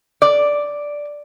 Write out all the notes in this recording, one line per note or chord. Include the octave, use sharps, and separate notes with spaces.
D5